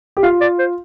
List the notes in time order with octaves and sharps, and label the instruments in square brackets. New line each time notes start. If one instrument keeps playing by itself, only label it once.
[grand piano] G4
[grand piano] F4 [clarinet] F5
[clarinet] D5
C5